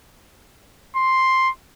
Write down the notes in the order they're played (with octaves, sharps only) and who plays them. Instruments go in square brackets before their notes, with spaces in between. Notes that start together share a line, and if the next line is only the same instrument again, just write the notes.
[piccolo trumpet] C6